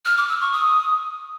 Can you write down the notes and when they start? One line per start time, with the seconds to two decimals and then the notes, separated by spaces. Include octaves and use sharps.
0.06 F6
0.17 D6
0.29 E6
0.41 C#6
0.52 D#6